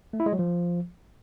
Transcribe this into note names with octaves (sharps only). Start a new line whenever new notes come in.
A3
E4
G#3
F#3
F3